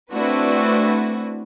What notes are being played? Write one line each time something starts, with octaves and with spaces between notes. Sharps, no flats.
A3 C4 D4 E4 F#4 B4